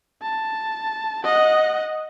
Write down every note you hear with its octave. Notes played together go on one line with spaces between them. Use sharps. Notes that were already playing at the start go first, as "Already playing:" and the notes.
A5
D#5 F#5